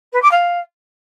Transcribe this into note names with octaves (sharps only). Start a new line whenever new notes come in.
B4
D6
F5